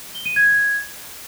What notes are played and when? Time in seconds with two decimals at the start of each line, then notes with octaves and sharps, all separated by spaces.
0.15 G7
0.25 D#7
0.36 G#6
0.47 G#6